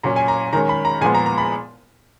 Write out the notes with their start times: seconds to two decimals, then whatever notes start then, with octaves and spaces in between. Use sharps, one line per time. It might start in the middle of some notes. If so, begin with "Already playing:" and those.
0.03 A#2 F#3 C#4 A#5
0.16 G#5
0.28 A#5
0.53 D#3 G#3 C#4 A#5
0.69 B5
0.85 A#5
1.01 A#2 F3 G#3 B3 G#5
1.15 A#5
1.26 A#5
1.38 B5